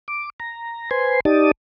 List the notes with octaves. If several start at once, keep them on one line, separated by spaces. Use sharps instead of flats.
D6
A#5
B4 C5 G#5 C6
D#4 G4 D5 A5 D#6